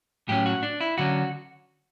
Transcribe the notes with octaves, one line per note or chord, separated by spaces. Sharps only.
A2 F#3 C#4 G4
F#4
D4
E4
D3 F#3 C#4 F#4